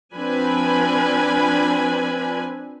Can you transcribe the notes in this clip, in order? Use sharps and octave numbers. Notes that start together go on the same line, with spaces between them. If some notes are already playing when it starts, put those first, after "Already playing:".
F3 C4 D4 B4 G#5 B5